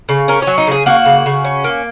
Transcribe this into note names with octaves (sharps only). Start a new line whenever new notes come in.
C#3
C#4 A#4
C#5
F#3
D#4
C#3 G#4
A#3 F#4
C#3
C#3
C#4
A#3